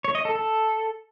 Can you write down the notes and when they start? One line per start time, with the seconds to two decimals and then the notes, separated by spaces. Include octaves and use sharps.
0.04 C#5
0.15 D#5
0.25 A4
0.35 A4